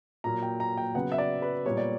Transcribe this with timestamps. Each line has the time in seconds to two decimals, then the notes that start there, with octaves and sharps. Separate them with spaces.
0.24 A#2 F#3 A#3 A#5
0.43 G5
0.60 A#5
0.78 G5
0.95 C#3 F#3 B3 F#5
1.12 E5
1.18 D5
1.42 B4
1.66 A#2 G3 B3 C#5
1.77 D5